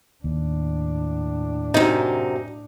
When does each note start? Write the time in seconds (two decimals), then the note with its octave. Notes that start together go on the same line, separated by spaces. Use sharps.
0.24 D#2 A2 D4
1.74 F#2 C3 D#4